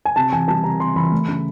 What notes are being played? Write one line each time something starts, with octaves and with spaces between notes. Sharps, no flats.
G#5
C3 A5
E3 G#5
G3 A5
C3 A#5
C3 C6
E3 B5
A3
C#3